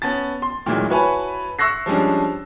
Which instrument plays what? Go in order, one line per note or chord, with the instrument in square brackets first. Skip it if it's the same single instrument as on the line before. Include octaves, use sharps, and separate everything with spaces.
[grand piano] B3 C#4 A5 A6
C6
D2 A#2 D#3 E3 F#3 G#3
E4 F#4 B4 C#5 G#5 A5
E5 C#6 E6 F#6 A#6 C7
F3 G3 G#3 C#4 D4